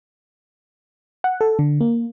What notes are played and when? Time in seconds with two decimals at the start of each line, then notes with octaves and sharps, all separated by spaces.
1.24 F#5
1.41 A4
1.59 D3
1.81 A#3